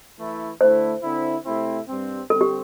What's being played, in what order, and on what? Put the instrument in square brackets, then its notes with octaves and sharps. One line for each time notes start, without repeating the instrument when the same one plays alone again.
[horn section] E3 A3 E4
[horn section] D3 A3 E4 [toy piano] C5
[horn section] D3 C4 E4
C3 A3 C4 E4
G2 G3 C4
[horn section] D3 G3 C4 [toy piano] A4
[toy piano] G4